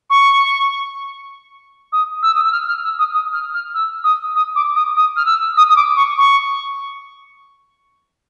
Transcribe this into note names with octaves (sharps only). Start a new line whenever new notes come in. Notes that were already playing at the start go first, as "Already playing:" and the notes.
C#6
D#6
E6
D#6
E6
F6
F6
E6
D#6
D#6
F6
F6
E6
D#6
D#6
D6
D#6
D#6
F6
E6
D#6
D#6
D6
C#6
C#6